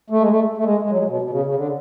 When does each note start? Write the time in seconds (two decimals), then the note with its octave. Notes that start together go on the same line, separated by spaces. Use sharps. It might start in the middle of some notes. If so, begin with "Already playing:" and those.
0.10 A3
0.20 G#3
0.28 A3
0.57 A3
0.64 G#3
0.83 G#3
0.90 F#3
0.98 G#3
1.07 B2
1.22 B2
1.30 C#3
1.45 C#3
1.55 D3